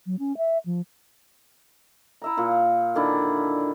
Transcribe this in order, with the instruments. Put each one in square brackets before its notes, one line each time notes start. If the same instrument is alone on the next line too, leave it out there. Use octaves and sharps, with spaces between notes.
[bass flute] F#3
C#4
E5
F3
[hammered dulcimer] E4 E5 A#5
A#2 F4 F#5
D3 D#3 D4 E4